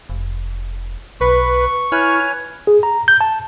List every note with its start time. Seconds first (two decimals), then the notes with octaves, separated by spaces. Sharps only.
0.09 F1
1.21 B1 B4 C#6
1.92 E4 B4 C#5 G#5 F6
2.67 G#4
2.83 A#5
3.08 G6
3.21 A5